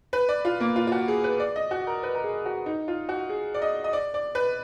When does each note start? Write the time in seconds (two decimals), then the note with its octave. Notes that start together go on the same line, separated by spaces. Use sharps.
0.13 B4
0.29 D5
0.45 F4
0.60 A#3
0.76 F4
0.87 F4
0.92 F#4
1.08 G#4
1.24 B4
1.40 D5
1.56 D#5
1.71 F#4
1.87 A#4
2.03 B4
2.15 A#4
2.24 G#4
2.46 F#4
2.66 D#4
2.88 F4
3.09 F#4
3.29 G#4
3.54 D5
3.62 D#5
3.84 D#5
3.93 D5
4.14 D5
4.35 B4